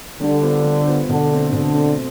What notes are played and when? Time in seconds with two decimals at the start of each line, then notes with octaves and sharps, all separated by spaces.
0.20 D3 G3
0.42 B3 F4 C5
0.65 G3
0.87 B3 F4 C5
1.09 B2 D3
1.31 A3 C4
1.52 B2 D3
1.74 A3 C4